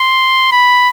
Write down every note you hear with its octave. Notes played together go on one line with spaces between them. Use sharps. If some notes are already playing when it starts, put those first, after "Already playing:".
Already playing: C6
B5